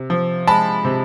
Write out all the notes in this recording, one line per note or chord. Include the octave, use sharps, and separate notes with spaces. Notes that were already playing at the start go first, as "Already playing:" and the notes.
Already playing: C3
F3
G#3 A5 B5
C3